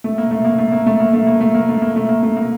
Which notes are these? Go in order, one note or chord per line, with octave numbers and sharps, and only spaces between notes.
A3
A#3
A3
A#3
A3
A#3
A3
A#3
A3
A#3
A3
A#3
A3
A#3
A3
A#3
A3
A#3